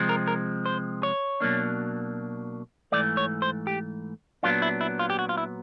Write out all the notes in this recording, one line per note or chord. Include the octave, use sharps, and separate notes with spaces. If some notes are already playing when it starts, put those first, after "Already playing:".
Already playing: C3 F3 G#3 C4
A#4
A#4
C5
C#5
B2 F#3 A#3 D4
G#2 E3 A3 D5
C#5
C5
G4
A#2 F#3 B3 D4 F4
E4
E4
F4
G4
F#4
F4
E4